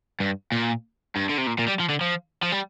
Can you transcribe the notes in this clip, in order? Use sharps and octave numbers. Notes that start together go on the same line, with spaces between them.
G2
A#2
G2
D3
C3
A#2
A#2
G3
F3
D3
F3
F3
G3